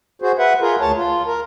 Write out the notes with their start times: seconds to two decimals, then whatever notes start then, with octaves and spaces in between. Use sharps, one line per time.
0.22 F#4 G#4 C5
0.39 B4 E5 F#5
0.61 F4 G#4 A#4
0.81 D2 C#5 A5
0.97 F4
1.26 A#4